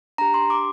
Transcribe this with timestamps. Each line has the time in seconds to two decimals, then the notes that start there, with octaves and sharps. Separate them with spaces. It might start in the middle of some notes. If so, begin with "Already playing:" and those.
0.18 D4 G4 A#5
0.34 C6
0.50 D6